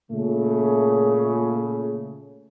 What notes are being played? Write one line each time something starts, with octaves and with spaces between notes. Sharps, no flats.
A#2 C#3 A3